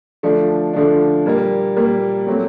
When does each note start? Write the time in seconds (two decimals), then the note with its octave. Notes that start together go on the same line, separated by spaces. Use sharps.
0.23 D3 F3 A3 D4
0.74 D3 F3 A3 D4
1.26 A#2 G3 A#3
1.76 A#2 G3 A#3
2.27 A#2 F#3 A3 C4